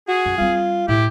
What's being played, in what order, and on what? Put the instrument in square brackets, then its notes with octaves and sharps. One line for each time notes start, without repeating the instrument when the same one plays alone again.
[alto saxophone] F#4 [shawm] G#4
[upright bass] F#2
[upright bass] G3 C4 [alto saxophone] F4
[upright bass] A2 [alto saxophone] E4 [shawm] G4